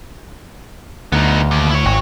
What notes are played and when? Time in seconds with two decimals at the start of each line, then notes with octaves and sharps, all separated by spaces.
1.12 D2 B3 D#4
1.51 D#2
1.71 E4 C#5
1.85 G#1 F#4 C#5